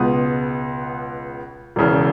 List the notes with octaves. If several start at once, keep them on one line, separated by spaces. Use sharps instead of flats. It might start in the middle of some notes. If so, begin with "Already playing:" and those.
Already playing: C#2 B2 G#3 B3 D#6
E1 E2 C#3